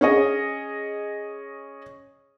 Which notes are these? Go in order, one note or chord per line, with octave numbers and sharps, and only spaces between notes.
C#4 G#4 C#5 D#5